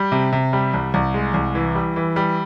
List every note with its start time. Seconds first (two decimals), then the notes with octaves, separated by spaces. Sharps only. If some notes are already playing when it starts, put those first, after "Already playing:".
Already playing: G3
0.12 C3
0.32 C3
0.53 G3
0.74 C2
0.94 C2
1.14 G#3
1.34 C2
1.55 E3
1.75 G3
1.96 E3
2.16 G3